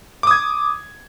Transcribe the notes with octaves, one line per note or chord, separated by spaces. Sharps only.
D6 D#6 G#6